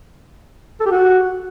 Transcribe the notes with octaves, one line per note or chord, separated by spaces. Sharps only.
A4
G4
F#4